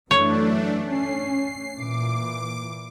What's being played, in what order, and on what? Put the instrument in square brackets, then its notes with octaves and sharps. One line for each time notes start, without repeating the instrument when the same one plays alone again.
[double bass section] F#2 E3 F#3 [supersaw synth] A3 D4 [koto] C#5
[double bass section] C#4 [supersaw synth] C7
[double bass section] A#2 E3 [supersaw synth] D6